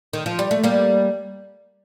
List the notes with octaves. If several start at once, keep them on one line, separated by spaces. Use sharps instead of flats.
D#3
F3
G3
A3
G3 A#3